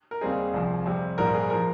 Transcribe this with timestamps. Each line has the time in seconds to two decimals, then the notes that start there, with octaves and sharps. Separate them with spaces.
0.11 A#4
0.21 D#2 C#3 G3 C4 D#4 G#4
0.53 C2 C3 F3
0.85 F2 C3 G3 C4
1.18 A#1 G#2 G3 A#4
1.34 G#4
1.50 F3 A#4